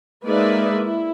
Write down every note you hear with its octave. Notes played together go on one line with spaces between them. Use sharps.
G#3 A#3 D#4 B4 D5 E5
E4